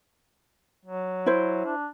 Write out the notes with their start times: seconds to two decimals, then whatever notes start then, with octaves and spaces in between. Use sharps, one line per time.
0.85 F#3
1.26 E4 C5
1.65 D4